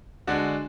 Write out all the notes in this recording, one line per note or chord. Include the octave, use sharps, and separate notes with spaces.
D3 G#3 D4 F#4